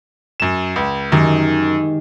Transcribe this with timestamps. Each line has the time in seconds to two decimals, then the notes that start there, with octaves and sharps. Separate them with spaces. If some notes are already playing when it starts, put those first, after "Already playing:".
0.40 F#2 E7
0.76 C#2
1.12 F#2 D#3 G#3 G4